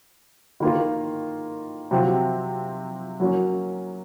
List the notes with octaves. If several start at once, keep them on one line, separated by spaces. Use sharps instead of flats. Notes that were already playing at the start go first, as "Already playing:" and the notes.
D#3 A#3 F4 A#4
C3 F#3 C4 F4
F#3 A#3 C#4